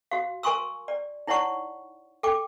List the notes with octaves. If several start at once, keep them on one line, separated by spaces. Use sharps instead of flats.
F#4 F5
A#4 G#5 C6 C#6 D#6 E6
D5
D#4 E4 C#5 D5 F#5 C#6
A4 G5 D6